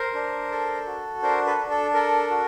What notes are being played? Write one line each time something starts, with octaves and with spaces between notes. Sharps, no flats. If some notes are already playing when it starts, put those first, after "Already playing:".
Already playing: A#4 C5
D4
A4
F#4
D4 A#4 C5
A4 B4
D4
A4
A4 A#4
F#4